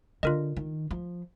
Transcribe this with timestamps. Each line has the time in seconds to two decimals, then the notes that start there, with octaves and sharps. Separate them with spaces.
0.23 D3 F4 A#4 D#5
0.56 D#3
0.91 F3